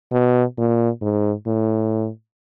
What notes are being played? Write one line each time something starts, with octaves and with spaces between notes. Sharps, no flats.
B2
A#2
G#2
A2